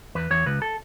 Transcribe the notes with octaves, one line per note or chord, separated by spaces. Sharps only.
E2 B4
E2 C#5
C#2 B4
A4